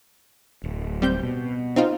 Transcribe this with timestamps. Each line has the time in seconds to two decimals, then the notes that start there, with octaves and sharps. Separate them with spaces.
0.64 D1
1.02 G3 C4 G6
1.23 B2
1.76 C4 D#4 F4